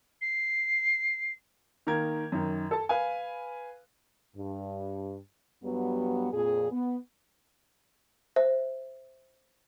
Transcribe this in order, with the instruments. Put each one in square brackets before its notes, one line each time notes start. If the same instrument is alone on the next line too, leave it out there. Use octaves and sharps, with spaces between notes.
[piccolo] C7
[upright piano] D#3 A#3 A#4 G#6
F#2 D#3
A4 A5
B4 F5 G#5
[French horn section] G2
G2 F#3 G3 B3
F2 A#2 G#4
B3
[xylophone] C5 E5